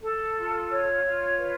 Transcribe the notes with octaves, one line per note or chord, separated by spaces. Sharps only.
A4
F4
C#5
F4
B4